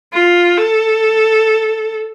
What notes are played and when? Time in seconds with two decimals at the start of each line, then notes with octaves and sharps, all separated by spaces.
0.13 F4
0.57 A4